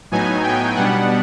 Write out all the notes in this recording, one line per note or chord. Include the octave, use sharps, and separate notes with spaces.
A2 F#3 B3 D#4 G#5
G5
B2 G3 B3 D4 F#5